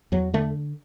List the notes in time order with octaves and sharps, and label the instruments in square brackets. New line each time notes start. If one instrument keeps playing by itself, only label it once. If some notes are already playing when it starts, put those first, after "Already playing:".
[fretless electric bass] E2 F#3
D3 A3